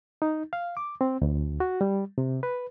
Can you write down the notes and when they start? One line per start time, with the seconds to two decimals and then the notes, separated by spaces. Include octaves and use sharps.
0.22 D#4
0.53 F5
0.77 D6
1.01 C4
1.22 D2
1.60 F#4
1.81 G3
2.18 C3
2.43 B4